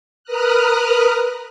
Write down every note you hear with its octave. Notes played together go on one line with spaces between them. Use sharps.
A#4 B4 A#5 D#6 F6 F#6